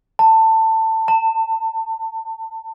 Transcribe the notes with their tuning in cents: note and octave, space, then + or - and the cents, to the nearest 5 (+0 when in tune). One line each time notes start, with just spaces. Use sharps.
A5 +20
A5 +35